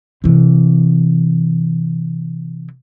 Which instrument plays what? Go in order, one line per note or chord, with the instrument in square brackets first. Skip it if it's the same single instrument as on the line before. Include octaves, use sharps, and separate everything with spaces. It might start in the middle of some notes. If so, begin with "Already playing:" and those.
[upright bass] C3 E3